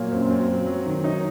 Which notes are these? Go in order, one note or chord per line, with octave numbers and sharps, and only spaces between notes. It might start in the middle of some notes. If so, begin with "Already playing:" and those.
Already playing: A#2 F#3 A#3
F#2 C4
F#3 C4
F#3
F#3
D#3
F#3 D#4